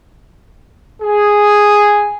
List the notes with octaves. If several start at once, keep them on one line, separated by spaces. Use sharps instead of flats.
G#4